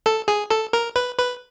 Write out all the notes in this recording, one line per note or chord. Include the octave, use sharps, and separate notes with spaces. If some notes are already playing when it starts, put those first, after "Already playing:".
A4
G#4
A4
A#4
B4
B4